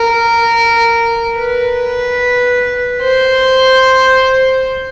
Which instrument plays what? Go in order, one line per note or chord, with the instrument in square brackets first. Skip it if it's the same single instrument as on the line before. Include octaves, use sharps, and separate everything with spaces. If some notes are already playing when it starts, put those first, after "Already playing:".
Already playing: [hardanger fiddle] A#4
B4
C5